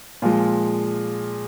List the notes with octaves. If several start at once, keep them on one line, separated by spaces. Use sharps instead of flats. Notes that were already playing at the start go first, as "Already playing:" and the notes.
A#2 F3 G#3